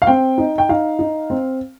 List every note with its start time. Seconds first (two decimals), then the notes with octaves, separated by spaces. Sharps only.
0.02 F5
0.07 C4 G5
0.38 D#4
0.58 G5
0.69 D#4 F5
0.99 D#4
1.30 C4